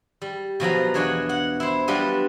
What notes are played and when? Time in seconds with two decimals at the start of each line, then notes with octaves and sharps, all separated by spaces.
0.22 G3
0.60 B2 F3 F#3 A#5
0.94 E2 D4 C#5 D#5 F#5 G#5
1.29 F#5
1.60 E4 C5
1.87 F#3 G3 B3 D4 F4